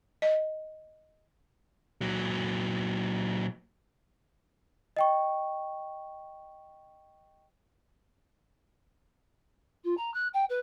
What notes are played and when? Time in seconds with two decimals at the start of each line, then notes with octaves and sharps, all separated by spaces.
0.22 D#5
2.01 A#2 F#3
4.97 D#5 G5 C#6
9.84 F4
9.97 A#5
10.14 F#6
10.34 G5
10.50 B4